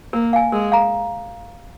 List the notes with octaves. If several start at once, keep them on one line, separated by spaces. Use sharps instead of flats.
A#3 A#4
F5 G#5
G#3 A#4
F5 A#5